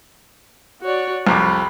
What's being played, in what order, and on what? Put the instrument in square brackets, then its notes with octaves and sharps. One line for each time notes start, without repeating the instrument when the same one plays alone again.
[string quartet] F#4 C#5 D5
[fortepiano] C2 F2 D6 [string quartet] B5